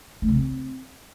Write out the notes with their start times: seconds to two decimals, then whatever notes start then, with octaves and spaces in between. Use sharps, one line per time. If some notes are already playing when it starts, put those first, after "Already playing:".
0.22 A3
0.28 C#3
0.35 C4